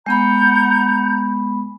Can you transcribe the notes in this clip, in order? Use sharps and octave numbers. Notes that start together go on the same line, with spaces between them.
G#3 B3 F#5 A#5 B5 G6